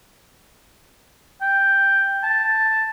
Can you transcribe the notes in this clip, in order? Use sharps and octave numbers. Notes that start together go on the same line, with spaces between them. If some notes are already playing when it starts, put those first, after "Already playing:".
G5
A5